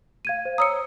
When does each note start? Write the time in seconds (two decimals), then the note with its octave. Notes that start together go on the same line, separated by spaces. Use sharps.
0.25 F5 G#6 D#7
0.45 C5
0.58 C#5 A#5 D#6 E6 C#7